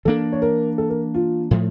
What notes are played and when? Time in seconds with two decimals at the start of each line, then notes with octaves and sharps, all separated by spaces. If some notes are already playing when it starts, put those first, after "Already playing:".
0.05 E3 A#3 D4 A4
0.33 C#5
0.42 A#4
0.78 A4
0.90 A#4
1.15 F4
1.51 A2 F3 A3